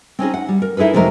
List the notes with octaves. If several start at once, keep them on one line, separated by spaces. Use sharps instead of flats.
C4 C#4 D#4 G#4
F#5
G3
A#4
D#4 E4 G#4 A4 B4
F2 C3 F#3 G#3 A#4